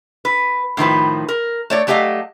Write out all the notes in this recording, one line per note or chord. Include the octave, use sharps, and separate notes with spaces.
B4
A2 D#3 F3 B4
A#4
A3 C#5 D5
F#3 A3 G4 D5 D#5 F5